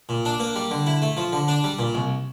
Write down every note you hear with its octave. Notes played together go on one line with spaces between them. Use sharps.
A#2
D4
A#3
G3
D3
E4
A3
F3
D3
D4
G3
A#2
C2